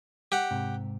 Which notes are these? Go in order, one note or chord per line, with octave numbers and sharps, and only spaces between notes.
G4 F#5
G#2 C3